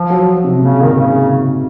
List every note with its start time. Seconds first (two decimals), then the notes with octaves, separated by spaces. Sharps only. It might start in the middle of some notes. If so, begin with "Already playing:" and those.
Already playing: F3
0.10 F#3
0.44 C3
0.61 A#2 C#3
0.82 G#2 D#3
0.94 C#3